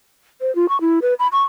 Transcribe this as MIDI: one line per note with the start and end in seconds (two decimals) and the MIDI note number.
0.41 0.54 72
0.55 0.69 65
0.69 0.80 85
0.81 0.99 64
1.02 1.14 71
1.19 1.27 83
1.32 1.43 85